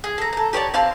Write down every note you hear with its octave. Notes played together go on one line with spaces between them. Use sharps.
G#4
A4 A#5
A4 A#5
G4 C#5 D5 A5
C4 F5 A5 C6